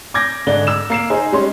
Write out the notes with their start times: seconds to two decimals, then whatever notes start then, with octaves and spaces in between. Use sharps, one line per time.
0.14 D6 G6 G#6 A#6
0.47 G#2 D3 D5 G7
0.67 E6 E7
0.90 A#3 C7 E7
1.10 D#4 G#4 C5 D#5
1.32 G3 G#3 C#4 C6